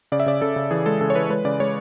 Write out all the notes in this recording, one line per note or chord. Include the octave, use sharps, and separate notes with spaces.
C#3 D5
E5
C#3 D5
C#3 A4
C#3
E3 G#4
G#3 A4
C#3 A4
C#5
E3 B4
G#3 B4
C#3 D5
G#3 C#5